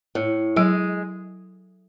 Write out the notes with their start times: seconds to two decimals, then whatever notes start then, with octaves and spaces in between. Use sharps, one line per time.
0.15 A2
0.56 F#3 G#3